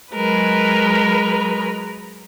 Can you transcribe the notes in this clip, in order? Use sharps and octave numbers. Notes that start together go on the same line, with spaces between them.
F#3 G#3 A#4 B4